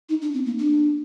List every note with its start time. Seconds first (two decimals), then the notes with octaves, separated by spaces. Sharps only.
0.09 D#4
0.22 D4
0.34 C4
0.46 A#3
0.59 D4